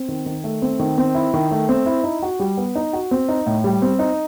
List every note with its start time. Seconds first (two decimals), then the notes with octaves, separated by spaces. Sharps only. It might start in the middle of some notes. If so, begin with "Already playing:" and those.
Already playing: C4
0.08 D#3
0.26 D#3
0.44 A3
0.62 C4
0.79 D#3
0.98 C4
1.15 E4
1.34 D#3
1.51 A3
1.69 C4
1.86 E4
2.04 D#4
2.22 F#4
2.40 G3
2.57 B3
2.75 D#4
2.93 F#4
3.11 C4
3.29 D#4
3.47 A2
3.64 G3
3.82 C4
3.99 D#4